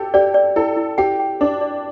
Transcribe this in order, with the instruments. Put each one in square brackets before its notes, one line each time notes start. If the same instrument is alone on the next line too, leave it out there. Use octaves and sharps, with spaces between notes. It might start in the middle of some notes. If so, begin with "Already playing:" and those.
Already playing: [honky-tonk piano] G4 A4
[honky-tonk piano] G4 [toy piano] D5
[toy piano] D5
[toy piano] E4 [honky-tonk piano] A4
[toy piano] E4
[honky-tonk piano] G4 [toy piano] G5
[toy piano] G5
[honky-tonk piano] D4 [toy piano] A#4
[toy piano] D5